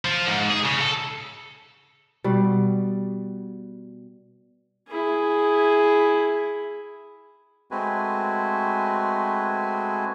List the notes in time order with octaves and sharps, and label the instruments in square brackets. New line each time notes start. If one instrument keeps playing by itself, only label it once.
[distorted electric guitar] F3
G#2
G#4
C#3
A4
[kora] B2 G3
[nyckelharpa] E4 G#4
[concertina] G#3 A3 C4 F#4 B4 G#5